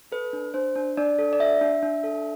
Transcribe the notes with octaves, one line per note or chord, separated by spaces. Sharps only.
A4 B4
D4
D4 C5
D4
D4 D5
A4
D5
D4 E5
D4
D4
A4